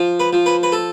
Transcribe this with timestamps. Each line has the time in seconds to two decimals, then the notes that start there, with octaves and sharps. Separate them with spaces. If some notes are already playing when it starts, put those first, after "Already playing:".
Already playing: F3
0.20 B4
0.33 F3
0.46 B4
0.63 B4
0.72 A4